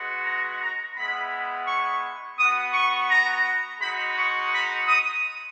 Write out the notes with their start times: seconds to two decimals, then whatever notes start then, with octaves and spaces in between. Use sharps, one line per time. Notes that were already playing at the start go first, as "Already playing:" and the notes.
Already playing: G#3 B3 F#4
0.24 A#5
0.60 A#5
0.95 G#3 B3 E4 B5
1.67 C#6
2.38 B3 F#4 D#6
2.73 C#6
3.09 A#5
3.80 G#3 D#4 F#4 B5
4.16 C#6
4.52 B5
4.87 D#6